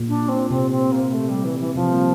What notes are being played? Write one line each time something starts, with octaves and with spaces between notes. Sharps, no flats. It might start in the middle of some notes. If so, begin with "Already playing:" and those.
Already playing: A#2
D4
C4
C3 C4
C4
A#3
A3
G3
E3
E3
C3 F3
G3 A#3